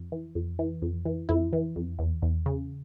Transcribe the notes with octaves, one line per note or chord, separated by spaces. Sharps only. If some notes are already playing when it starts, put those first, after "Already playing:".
Already playing: F2
E3
F2
E3
F2
E3
F2 E4
E3
F2
E2
E2
C#3